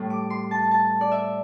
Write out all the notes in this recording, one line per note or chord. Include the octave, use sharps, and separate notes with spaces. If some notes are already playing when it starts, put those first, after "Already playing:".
Already playing: A2 G3
D6
C6
A5
A5
D5
E5